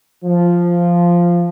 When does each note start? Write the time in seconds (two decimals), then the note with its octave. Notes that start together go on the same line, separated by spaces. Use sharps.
0.23 F3